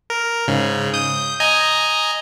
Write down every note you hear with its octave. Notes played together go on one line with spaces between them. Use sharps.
A#4
G#2 C#3
D#6 G6
D#5 G#5 A#5